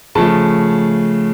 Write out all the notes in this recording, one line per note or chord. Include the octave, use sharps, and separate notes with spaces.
C#3 F3 A3 A5